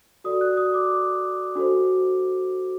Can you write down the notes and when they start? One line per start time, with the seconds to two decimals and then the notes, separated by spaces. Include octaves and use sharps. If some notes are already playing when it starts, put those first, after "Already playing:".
0.24 F#4 A4 D5 D#6
0.41 F#6
0.57 D#6
0.74 D6
1.55 D4 F#4 A4 C5